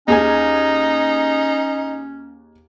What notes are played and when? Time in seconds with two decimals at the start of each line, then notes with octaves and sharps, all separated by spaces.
0.08 D#2 C#4 D#4 G#4 G#5